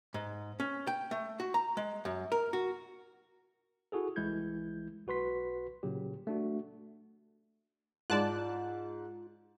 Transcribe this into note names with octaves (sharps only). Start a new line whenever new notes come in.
G#2
C#4
G5
A3
F#4
A#5
G#3
F#2
A#4
F#4
E4 F#4 G#4 A4
C2 E3 G#3 E4 G6 G#6
B1 F#4 B4 C6 B6
A#2 C#3 F#3 G4
A3 D4 F#4
G#2 F4 D5 A5 F#6